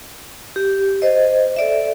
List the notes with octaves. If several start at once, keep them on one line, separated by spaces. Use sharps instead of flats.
G4
C5 D#5
A4 D5 E5